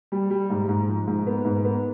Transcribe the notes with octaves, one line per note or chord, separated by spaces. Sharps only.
G3
G3
G#2
G#2
F3
G#2
B3
G#2
B3